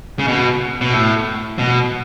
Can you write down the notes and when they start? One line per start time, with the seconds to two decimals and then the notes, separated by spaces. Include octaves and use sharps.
0.19 C#3
0.28 B2
0.81 B2
0.93 A2
1.59 B2